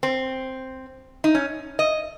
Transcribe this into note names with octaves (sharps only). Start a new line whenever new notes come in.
C4
D#4
C#4
D#5